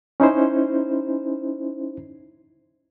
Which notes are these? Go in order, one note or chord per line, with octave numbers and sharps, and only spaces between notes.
C#4 D#4 E4 C5